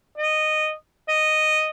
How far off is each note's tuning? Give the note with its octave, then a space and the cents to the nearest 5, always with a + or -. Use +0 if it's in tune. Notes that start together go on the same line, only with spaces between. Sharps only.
D#5 -15
D#5 -10